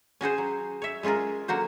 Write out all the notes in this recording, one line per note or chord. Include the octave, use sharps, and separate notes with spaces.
C#4 F#4 G#4 C5
F#3
C#5 E5
G#3 C#4 F4 G#4 A#4
D3 F#3 A#3 F#4 C5